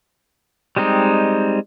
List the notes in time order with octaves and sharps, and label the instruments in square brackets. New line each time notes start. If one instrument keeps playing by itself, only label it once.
[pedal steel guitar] G3 G#3 C4 D#4